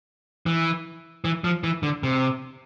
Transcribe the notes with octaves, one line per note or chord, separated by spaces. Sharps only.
E3
E3
F3
E3
D3
C3